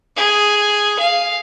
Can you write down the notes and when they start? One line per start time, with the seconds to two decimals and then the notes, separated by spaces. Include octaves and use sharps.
0.17 G#4
0.99 F5